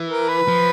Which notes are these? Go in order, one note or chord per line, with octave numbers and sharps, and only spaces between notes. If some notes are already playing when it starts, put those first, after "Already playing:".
Already playing: E3
A#4
B4
F3